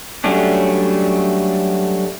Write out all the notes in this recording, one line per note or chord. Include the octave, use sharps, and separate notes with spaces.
F#3 G3 A3 C#4 D4